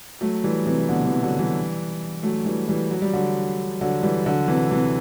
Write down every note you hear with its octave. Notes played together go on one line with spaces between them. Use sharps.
F#3 A3
E3 G3
C3 E3
B2 D3
C3 E3
D3 F#3
E3 G3
F#3 A3
E3 G3
E3 G3
F#3
G3
D3 F#3
D3 F#3
E3 G3
D3 F#3
C3 E3
C3 E3